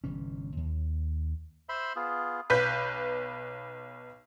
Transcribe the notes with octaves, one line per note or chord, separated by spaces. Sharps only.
G1 C3 E3 C#4
D#2
C5 E5 B5 C6
B3 F4 G#4
B1 B4 G6 B6